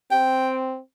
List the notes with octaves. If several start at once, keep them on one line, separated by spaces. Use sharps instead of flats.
C4 G5